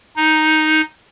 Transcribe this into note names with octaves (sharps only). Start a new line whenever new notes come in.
D#4